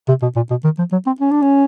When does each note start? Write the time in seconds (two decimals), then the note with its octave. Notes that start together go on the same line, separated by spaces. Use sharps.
0.08 C3
0.22 B2
0.36 A#2
0.50 B2
0.64 D#3
0.78 F3
0.92 F#3
1.06 C4
1.20 C#4
1.31 D4
1.42 C#4